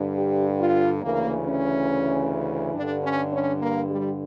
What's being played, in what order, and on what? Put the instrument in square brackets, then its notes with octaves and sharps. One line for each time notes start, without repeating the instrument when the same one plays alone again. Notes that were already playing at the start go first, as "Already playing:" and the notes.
Already playing: [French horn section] G2 D3
G4
F4
D2 C#3 E3 A#3
C#4
G2 D3 D4
C#4
C#4
A#3
G3